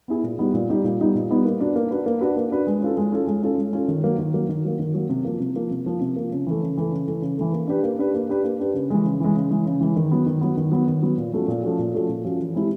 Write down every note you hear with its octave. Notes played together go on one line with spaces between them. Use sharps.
B3 E4 G#4
A#2
G3 B3 D#4 G4
A#2
G3 B3 D#4 G4
A#2
G3 B3 D#4 G4
A#2
G3 B3 D#4 G4
A#3
D4 F#4 B4
A#3
D4 F#4 B4
A#3
D4 F#4 B4
A#3
D4 F#4 B4
G#3
C#4 F4 A4
G#3
C#4 F4 A4
G#3
C#4 F4 A4
G#3
C#4 F4 A4
D#3
F#3 A#3
D#3
F#3 A#3
D#3
F#3 A#3
D#3
F#3 A#3
C3
F3 A#3
C3
F3 A#3
C3
F3 A#3
C3
F3 A#3
C#3
E3 A3
C#3
E3 A3
C#3
E3 A3
C#3
E3 A3
A#3
D4 G4 B4
A#3
D4 G4 B4
A#3
D4 G4 B4
A#3
D4 G4 B4
C#3
E3 G#3
C#3
E3 G#3
C#3
E3 G#3
C#3
E3 G#3
D#3
F#3 B3
D#3
F#3 B3
D#3
F#3 B3
D#3
F#3 B3
A#2
F3 A3 C#4 F#4
A#2
F3 A3 C#4 F#4
A#2
F3 A3 C#4 F#4
A#2
F3 A3 C#4 F#4
E3
G#3 C4 E4 G4